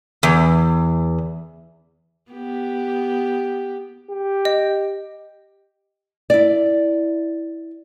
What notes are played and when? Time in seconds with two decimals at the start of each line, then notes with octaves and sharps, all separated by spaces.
0.23 E2
2.31 B3 G4
4.11 G4
4.45 D#5
6.30 E4 D5